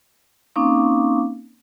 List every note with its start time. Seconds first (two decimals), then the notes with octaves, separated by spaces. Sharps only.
0.56 A#3 C4 C#4 D#4 F5 D6